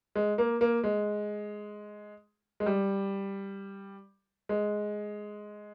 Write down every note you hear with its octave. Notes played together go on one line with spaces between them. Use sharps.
G#3
A#3
A#3
G#3
G#3
G3
G#3